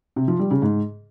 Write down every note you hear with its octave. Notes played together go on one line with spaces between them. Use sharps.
C3
F3
G3
C#3
G#2